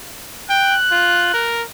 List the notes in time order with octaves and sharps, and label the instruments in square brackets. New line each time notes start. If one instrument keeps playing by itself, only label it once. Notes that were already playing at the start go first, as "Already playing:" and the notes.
[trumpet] G5 [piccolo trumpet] F#6
[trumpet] F4
A#4